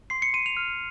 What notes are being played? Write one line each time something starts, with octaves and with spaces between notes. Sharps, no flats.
C6 C7
C#7
C6 D#7
F7
F6